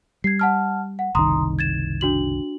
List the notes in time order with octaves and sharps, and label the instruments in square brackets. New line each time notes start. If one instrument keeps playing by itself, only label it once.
[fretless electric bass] G3 [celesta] G#6 C7
[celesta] F#5 A5 F6
F#5
[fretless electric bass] F#1 C2 D#3 [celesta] A#5 C6 D#6
[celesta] G#6 A6 E7
D4 F#4 F#7